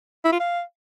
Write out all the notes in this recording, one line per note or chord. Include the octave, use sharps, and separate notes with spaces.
E4
F4
F5